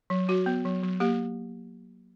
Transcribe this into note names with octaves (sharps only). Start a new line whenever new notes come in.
F#3
F#3 F#4
B3
F#3
F#3
A#3 G4